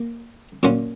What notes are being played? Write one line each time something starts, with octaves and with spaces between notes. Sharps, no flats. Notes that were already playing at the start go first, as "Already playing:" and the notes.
Already playing: A#3
A#2 F#3 C#4 F4